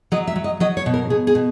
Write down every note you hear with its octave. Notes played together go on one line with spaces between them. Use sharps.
F#3 D#5
E5
F#3
D#5
F#3 D#5
C#5
B2
A#4
B2 G#4
G#4
B2